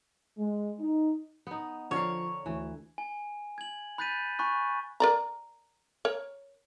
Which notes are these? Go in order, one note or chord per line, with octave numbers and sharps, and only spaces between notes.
G#3
D#4
B3 D#4
D3 F3 A#4 C#5 F5
D2 E3
G#5
G#6 F#7
B5 F#6 G6 A6 B6 D#7
G#5 B5 C#6 F#6
A#4 D5 A#5
A#4 C#5